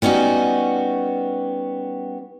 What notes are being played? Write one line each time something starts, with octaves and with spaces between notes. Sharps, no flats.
G3 B3 C#4 D#4 F#4